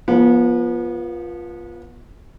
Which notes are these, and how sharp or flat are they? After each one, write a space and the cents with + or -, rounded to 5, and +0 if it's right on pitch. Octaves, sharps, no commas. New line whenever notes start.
F3 +0 B3 -35